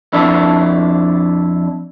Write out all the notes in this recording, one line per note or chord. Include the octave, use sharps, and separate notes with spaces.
F2 D4 E4